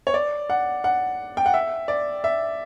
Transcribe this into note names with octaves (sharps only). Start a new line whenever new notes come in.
C#5
D5
F#5
F#5
G5
F#5
E5
D5
E5